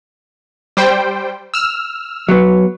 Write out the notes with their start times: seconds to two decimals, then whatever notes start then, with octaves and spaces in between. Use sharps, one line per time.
0.77 G3 C5 G5
1.54 E6 F6
2.29 F#3 B3